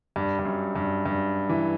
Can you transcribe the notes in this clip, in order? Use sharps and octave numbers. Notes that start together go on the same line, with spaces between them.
G2
G2
F#2
G2
G2
E3